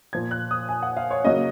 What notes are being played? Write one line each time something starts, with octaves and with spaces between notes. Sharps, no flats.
A#2 F3 A#3 G#6
F#6
D#6
G#5
F#5
F5
C#5
C#3 F#3 A#3 D#5